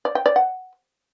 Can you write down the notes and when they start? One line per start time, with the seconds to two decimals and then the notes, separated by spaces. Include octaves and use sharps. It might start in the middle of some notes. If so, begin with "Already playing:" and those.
0.05 D5
0.15 G5
0.26 D5
0.36 F#5